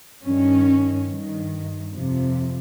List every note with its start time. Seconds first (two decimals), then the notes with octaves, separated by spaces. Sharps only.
0.24 G2 D#3 C#4
1.08 G2 D#3
1.92 F2 C3 F3